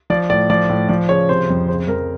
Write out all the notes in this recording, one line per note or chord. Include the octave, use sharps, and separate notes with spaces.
F3 D5
A2 D5
F3 D5
A2
F3 D5
C#3 C#5
C3 C5
F2
C#3 C5
F2 A#4